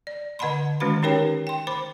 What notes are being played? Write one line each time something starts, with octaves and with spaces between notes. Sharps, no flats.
D5
D3 D#5 F#5 A5 B5 C6
D#3 G#3 C#4 F#4 B4 B5
C#4 D#4 G4 A#4 C#5 G5
G5 C6
C5 B5 D6